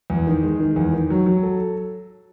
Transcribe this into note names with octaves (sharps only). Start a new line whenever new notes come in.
E2
D#3
G#3
D#3
E2
D#3
F#3
F#3
A4